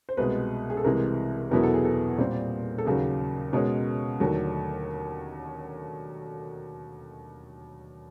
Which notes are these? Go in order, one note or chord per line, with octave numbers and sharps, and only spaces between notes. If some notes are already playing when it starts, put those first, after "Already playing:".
C5
C2 B2 G#3 B4
G#4
A4
C2 C3 E3 G#3 A#4
E2 B2 F#3 B3 E4 A#4
A4
G#4
A4
A#2 G3 C4
A4
D#2 C#3 F#3 G#4
B2 G#3 C#4 A#4
D#2 D3 F#3 A3